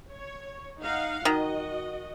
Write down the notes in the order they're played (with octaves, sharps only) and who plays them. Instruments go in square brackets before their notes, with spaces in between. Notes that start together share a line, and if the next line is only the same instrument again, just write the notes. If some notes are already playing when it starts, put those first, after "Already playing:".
[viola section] C#5
D#4 F5 F#5
[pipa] D#3 [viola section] F#4 D#5